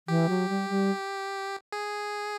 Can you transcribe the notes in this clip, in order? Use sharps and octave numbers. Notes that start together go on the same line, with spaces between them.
E3 G4
F#3
G3
G3
G#4